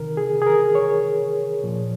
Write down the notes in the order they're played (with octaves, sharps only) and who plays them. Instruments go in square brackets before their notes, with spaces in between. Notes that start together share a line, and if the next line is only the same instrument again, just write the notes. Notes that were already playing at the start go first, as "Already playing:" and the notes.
Already playing: [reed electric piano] C3 D#3 A#4
G#4
G#4
A#4
C#5
A#2 F3